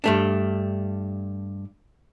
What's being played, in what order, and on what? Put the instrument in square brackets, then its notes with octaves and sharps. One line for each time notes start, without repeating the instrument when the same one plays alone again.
[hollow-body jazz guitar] G2 A3 D4